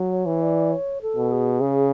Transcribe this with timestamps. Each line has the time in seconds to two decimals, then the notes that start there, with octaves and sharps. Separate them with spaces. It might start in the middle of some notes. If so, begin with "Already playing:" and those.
Already playing: F#3
0.11 C#5
0.26 E3
0.41 D5
0.71 C#5
1.02 A4
1.16 B2
1.31 G#4
1.61 C#3